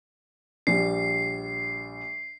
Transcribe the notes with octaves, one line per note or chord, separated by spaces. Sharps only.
A#1 G3 C7